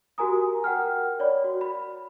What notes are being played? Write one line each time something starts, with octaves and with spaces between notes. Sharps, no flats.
F#4 G4 A#4 G#5 A#5 D#6
A#4 F#5 G5 F6
C#5 D5 B5
F#4
B5